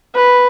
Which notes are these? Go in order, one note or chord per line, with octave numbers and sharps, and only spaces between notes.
B4